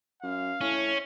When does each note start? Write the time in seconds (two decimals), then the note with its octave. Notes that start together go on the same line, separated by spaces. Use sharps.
0.23 F#2 F5
0.61 A2 C#4